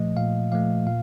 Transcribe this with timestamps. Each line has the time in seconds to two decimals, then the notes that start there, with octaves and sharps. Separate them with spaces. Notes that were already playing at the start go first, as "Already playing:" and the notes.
Already playing: A#2 F3 A3 D#5
0.17 A#2 F5
0.52 F3 A3 F5
0.87 A#2 F5